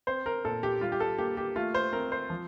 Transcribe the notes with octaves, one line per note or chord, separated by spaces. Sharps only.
C4 C5
A#4
A#2 A4
G4
G3 F4
G4
A4
A#3 G4
G4
A3 F4
C5
C4 A#4
C5
F3